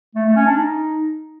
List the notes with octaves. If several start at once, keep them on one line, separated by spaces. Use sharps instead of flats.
A3
A3
C#4
D4
D#4